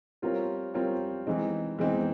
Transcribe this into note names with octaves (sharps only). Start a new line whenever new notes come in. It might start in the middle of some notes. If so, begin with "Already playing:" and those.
G3 C4 F4 A#4 C#5
G3 C4 F4 A#4 C#5
E3 G#3 C4 D#4
E3 G#3 C4 D#4